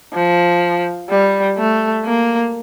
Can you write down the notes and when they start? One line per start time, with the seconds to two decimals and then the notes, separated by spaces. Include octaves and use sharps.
0.14 F3
1.10 G3
1.57 A3
2.05 A#3